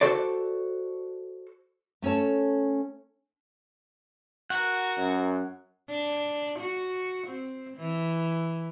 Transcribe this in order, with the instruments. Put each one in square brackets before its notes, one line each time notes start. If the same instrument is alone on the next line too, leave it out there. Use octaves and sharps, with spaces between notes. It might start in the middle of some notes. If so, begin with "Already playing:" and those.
[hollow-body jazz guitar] F#4 A4 C5 D5
[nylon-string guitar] A3 C#4 A4 C#5 A5
[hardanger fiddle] F#4 A#4 [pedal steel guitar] F#5
[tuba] F#2
[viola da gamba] D4
F#4
C4
E3